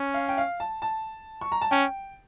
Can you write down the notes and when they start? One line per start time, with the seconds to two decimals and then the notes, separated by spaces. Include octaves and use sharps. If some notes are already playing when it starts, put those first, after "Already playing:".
Already playing: C#4
0.14 F5
0.29 G5
0.38 F5
0.60 A5
0.82 A5
1.41 C#6
1.52 A#5
1.61 A5
1.71 C#4 G5